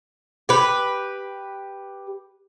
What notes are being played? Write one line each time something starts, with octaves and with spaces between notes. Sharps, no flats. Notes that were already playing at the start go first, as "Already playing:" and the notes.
G4 B4